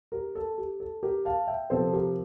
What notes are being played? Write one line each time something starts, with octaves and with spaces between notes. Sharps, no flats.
G4 A#4
A4
G4
A4
G4 A#4
F5 A5
E5 G5
C3 F3 C4 A4 C5
G4 A#4